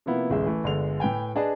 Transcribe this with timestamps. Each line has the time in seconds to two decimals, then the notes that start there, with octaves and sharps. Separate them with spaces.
0.06 C3 F3 A#3 B3 E4 B4
0.30 D1 A1 G#3 G#4 E5
0.46 E3 A3
0.64 G1 D3 G#3 F7
1.00 A2 B4 G5 G#5
1.36 D4 G#4 B4 D5 D#5 A5